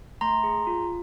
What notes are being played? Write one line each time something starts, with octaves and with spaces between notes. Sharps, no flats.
A3 A#5 C6
G#4
F4